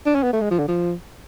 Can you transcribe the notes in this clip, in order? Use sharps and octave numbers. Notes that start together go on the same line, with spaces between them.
D4
C#4
B3
A3
G#3
F3
D3
F3